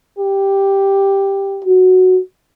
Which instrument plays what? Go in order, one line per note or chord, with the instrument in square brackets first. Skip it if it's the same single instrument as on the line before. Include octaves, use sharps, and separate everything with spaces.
[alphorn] G4
[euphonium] F#4